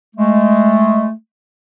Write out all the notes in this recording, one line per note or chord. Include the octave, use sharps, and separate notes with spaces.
G#3 A3